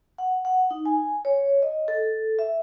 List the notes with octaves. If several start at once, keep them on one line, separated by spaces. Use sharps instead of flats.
F#5
F#5
D#4
G#5
C#5
D#5
A4
E5